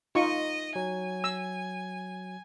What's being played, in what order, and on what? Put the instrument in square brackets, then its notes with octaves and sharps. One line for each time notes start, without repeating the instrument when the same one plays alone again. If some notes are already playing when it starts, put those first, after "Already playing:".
[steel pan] D#4 F4 C#6 [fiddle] D#5
[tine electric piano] F#3 [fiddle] G#5
[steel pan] E6